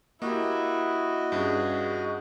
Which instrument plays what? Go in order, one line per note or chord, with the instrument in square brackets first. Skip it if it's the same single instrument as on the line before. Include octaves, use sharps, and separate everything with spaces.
[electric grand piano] A#3 G4 [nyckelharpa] E4 [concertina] F#4 D#5
[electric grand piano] G2 [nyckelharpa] C#4 G#4